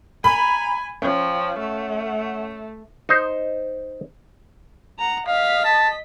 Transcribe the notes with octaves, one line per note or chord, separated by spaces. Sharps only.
G#5 A#5 B5
F3 C#4 G5
A3 F#5
D#4 C5
F#5 A#5
D#5 F5 B6
A5